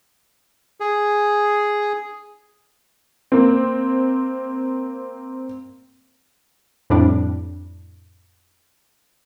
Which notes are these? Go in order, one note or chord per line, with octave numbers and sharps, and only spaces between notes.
G#4
A#3 C4
F2 A2 G3 D4